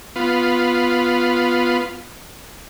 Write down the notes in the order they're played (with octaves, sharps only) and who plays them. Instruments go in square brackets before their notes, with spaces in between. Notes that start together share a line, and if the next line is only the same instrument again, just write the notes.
[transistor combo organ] B3 F4